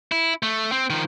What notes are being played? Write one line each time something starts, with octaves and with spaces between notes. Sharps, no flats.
E4
A3
C4
D#3 F3